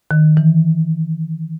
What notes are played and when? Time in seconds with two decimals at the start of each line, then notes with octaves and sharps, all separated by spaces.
0.11 D#3
0.37 E3